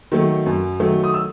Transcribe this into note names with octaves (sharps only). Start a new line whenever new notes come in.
D#3 F#3 A3
F#2
D#3 F#3 A3
D#6
E6